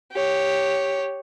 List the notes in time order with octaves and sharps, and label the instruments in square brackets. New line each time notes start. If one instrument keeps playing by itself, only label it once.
[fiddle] G4 C#5